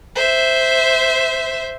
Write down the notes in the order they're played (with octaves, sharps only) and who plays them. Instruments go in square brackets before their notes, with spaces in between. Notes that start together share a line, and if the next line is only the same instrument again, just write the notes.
[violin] C5 E5